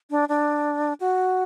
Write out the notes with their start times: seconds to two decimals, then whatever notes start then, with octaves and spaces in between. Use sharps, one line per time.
0.10 D4
0.29 D4
1.00 F#4